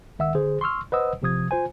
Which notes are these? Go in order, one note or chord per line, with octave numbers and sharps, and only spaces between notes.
C#2 D#3 E5 F#5 E6
D3 G#4 C5
C6 C#6 E6 F6
B4 C5 D#5 F#5 D#6 E6
A1 C3 F3 D#6 G#6
F4 C5 G#5